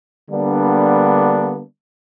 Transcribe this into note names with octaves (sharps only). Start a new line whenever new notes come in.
D3 G3 A#3 B3 D4